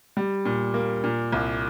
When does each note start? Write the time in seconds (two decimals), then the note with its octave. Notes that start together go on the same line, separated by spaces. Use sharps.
0.17 G3
0.45 A#2
0.74 A#3
1.04 A#2
1.32 C2